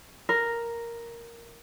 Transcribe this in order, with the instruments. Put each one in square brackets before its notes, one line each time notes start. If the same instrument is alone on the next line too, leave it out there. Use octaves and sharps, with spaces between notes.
[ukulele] A#4